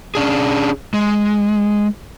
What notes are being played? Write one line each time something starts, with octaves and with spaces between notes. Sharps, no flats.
C#4 D4 G#4
G#3